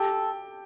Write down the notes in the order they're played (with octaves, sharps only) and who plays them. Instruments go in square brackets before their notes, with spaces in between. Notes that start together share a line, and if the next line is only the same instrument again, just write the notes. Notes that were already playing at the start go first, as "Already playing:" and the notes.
Already playing: [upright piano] G4 G5 [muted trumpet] A4